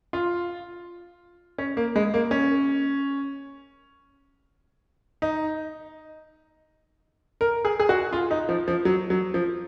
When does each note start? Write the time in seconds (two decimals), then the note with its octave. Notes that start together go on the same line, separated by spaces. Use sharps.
0.13 F4
1.58 C#4
1.77 A#3
1.96 G#3
2.14 A#3
2.31 C#4
5.22 D#4
7.41 A#4
7.65 G#4
7.80 G#4
7.89 F#4
8.13 F4
8.31 D#4
8.49 F3
8.68 F3
8.85 F#3
9.10 F#3
9.34 F3